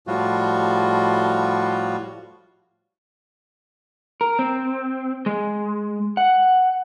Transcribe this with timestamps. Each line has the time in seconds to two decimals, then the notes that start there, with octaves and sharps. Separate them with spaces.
0.07 A2 F3 G3 F4 F#4
4.21 A#4
4.39 C4
5.26 G#3
6.17 F#5